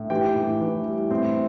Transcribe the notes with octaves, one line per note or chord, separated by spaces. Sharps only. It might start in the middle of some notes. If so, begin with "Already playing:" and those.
Already playing: A2
E3 G4 G5
A2
E3
G3
A2 C4 C5